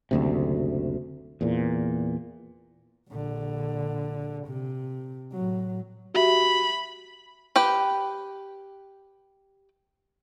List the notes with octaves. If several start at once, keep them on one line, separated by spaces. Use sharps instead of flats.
F#1 D2 C3
E2 A#2
A#1 D3
C3
A2 F#3
F#4 G4 E5 B5
G4 B4 G5